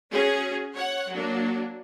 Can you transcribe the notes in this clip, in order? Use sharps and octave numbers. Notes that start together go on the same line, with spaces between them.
C#4 F#4 G#4
C#5 F#5
F#3 A#3 D4